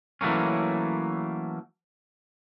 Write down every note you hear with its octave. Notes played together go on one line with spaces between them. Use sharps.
E3 F#3 A3 A#3 C#4